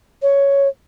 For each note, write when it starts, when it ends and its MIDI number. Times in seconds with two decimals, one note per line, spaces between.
0.22 0.68 73